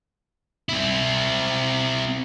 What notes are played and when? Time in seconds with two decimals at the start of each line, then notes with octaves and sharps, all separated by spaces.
0.69 C4 E4